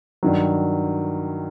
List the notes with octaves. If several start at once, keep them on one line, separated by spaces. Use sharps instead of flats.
G2 D#3 F#3